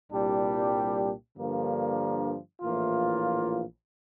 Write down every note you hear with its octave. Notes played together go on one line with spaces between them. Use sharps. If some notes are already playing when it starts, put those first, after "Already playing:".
C2 A#2 G3 D4 G4
G2 D3 F3 A#3
A#1 A2 E3 A#3 F4